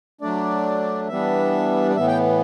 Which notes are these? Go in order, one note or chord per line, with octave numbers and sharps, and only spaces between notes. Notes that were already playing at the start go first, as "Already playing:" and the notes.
F#3 A3 D4 D5
E3 G3 B3 D4 E5
D5
A2 E3 B3 E5
G5